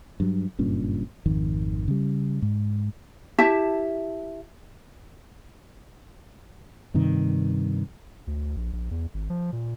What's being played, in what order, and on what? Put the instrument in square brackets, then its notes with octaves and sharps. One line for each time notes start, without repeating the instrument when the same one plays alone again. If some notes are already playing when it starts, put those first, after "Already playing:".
[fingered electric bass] G2 F#3
F#1 G2 A#2 C#4
G#1 F2 D#3
C#3 G3
G#2
[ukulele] E4 G4 E5 A5
[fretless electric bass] G2 C3 D#3
[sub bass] D2
A#1
A#1
E2
G#1
F3
A#2